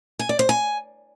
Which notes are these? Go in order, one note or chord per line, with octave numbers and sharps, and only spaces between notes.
G#5
D5
C5
G#5